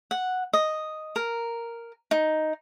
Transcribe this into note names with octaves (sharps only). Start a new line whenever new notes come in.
F#5
D#5
A#4
D#4